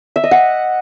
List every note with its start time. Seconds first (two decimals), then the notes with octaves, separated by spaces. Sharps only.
0.16 E5
0.24 D#5
0.31 F#5